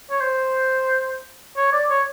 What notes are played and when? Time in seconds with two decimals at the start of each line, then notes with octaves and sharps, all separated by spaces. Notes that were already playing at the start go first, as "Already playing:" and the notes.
0.10 C#5
0.21 C5
1.57 C#5
1.73 D5
1.90 C#5